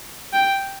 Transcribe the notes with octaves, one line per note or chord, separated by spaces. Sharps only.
G5